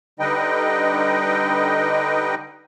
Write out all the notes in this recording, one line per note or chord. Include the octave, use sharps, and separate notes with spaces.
D3 G3 D#4 B4 D#5 G5